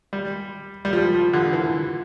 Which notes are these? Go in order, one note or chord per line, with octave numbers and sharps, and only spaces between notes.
G3
G3
F3
F3
D3
E3